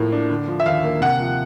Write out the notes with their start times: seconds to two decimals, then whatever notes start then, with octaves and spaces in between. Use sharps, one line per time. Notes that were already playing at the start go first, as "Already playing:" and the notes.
Already playing: A2 F3 A#3
0.12 D4
0.30 D3
0.48 F3
0.60 E5
0.66 D#2 F5
0.83 A#3
1.01 C3 F#5
1.20 F3